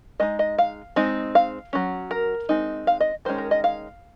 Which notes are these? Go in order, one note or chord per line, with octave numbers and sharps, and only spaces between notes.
G#3 D#4 D#5
D#5
F5
G#3 C4 D#4
F5
F#3 C#4
A#4
G#3 C4 D#4
F5
D#5
D#3 G#3 C#4 C5
A#4
D#5
F5